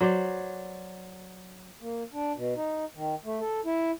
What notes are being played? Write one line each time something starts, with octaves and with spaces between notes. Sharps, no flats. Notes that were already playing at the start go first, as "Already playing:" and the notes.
F#3 C5 D5
A#3
D4
B2
D#4
D#3
A3
A4
E4